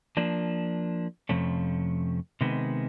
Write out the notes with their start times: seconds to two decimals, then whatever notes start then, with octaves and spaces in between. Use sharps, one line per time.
0.17 F3 A#3 D4
1.29 F2 C3 F3 A3 C#4
2.41 C3 D#3 G#3 B3